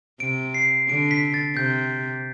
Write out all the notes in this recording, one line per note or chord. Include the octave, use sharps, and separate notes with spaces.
C3 D7
C7
D3 D7
B6
A6
C3 G6